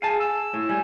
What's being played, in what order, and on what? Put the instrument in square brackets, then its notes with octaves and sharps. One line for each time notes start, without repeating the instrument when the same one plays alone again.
[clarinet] G#4 [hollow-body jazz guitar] F5 G#5 A5
[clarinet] E6
[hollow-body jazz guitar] A2
[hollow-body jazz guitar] G3 [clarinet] G#5